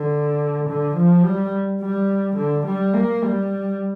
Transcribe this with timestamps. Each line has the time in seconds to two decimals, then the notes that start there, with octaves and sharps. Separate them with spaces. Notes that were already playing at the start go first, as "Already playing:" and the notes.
Already playing: D3
0.69 D3
0.97 F3
1.25 G3
1.82 G3
2.37 D3
2.66 G3
2.94 A#3
3.22 G3